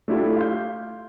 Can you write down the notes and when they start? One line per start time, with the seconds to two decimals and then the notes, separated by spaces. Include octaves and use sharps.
0.08 A3 D4 E4 F4 G4 A4
0.36 F5 C6 G6